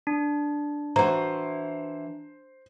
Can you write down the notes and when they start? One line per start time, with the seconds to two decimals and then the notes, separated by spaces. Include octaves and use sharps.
0.07 D4
0.96 E3 F#4 C5 A#5